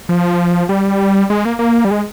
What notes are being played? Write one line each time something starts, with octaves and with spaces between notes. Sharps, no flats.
F3
G3
G#3
A#3
A#3
G3
G#3